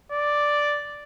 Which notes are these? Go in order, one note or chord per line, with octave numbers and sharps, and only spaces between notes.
D5